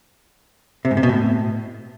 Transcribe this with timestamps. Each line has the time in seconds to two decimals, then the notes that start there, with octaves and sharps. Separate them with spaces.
0.85 C3
0.91 G#2
0.97 C3
1.03 B2
1.09 A2